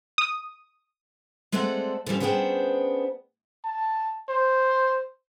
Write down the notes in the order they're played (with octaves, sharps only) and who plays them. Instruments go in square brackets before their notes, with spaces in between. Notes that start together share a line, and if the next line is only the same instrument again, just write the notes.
[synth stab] D#6
[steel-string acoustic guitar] G#3 A3 C4 A4 D5 F#5
D3 F3 G3 C#4
B3 C#4 D4 G#4 C5 G5
[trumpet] A5
C5